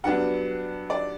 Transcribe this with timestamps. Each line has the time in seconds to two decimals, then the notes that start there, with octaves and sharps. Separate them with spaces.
0.04 G2 F#3 B3 D4 F#5
0.90 D5